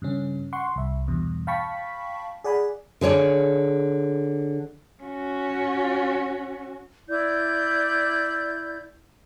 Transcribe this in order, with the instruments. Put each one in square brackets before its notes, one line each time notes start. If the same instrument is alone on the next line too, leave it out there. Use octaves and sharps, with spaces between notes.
[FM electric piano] G2 C#3 C#4
F#5 C6 C#6
C2 E5
E2 G2 B2
F5 G5 A5 B5 C#6 B6
G#4 D5 F#5 G#5 B5
[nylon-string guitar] D3 G#4 C#5 D5
[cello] C#4 F#4
[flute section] E4 D5 G6